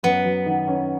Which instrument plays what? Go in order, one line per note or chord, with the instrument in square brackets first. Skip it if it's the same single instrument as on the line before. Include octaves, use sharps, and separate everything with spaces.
[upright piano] F#2 [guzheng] B3
[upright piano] F#3
D#3
C#4